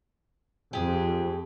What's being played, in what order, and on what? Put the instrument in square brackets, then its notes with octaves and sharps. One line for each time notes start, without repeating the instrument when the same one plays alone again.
[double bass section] F2 [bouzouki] G4 G#4